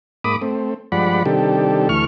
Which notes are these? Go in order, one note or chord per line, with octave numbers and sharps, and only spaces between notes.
G#2 A#3 B5 D6 D#6
A3 C4
G2 F3 G#3 D5 F#5 B5
C3 D#3 G3 D4 G4 A4
D2 E3 A3 C#6 F6